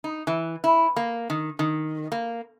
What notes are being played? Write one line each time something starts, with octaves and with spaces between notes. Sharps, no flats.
D#4
E3
E4
A#3
D#3
D#3
A#3